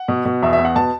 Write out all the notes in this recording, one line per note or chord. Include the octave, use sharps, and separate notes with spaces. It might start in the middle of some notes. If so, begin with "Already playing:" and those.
Already playing: F#5
B2
B2
E2 E5
E5
B3
F#5
B2 A5